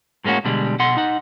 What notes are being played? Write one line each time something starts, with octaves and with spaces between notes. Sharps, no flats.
A2 G#3 A#3 C#4 F#4
B2 D3 G3 G#3
B2 F#5 C6
D#4 F#5